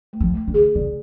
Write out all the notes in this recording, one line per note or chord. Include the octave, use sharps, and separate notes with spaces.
A3
F3
A3
D3
G#4
C#3 D5